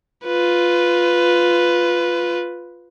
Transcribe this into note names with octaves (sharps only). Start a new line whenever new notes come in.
F4 B4